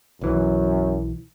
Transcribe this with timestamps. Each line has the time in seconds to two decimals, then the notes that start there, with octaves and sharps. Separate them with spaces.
0.21 B1 F#2 E3